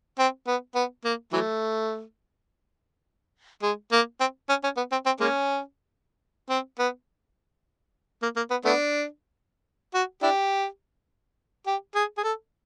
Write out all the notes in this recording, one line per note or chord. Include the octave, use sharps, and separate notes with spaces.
C4
B3
B3
A#3
E3 F#3 A3
G#3
A#3
C4
C#4
C#4
B3
C4
C4
G#3 A#3 C#4
C4
B3
A#3
A#3
B3
A3 B3 D4
F#4
D4 E4 G4
G4
G#4
G#4
A4